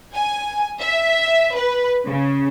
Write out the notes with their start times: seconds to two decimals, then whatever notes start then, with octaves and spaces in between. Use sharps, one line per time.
0.14 G#5
0.81 E5
1.56 B4
2.08 C#3